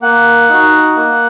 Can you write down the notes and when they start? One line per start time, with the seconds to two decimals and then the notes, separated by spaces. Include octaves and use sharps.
0.02 A#3 F#5
0.49 D#4 F#4
0.96 A#3